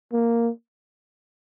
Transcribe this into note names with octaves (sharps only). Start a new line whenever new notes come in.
A#3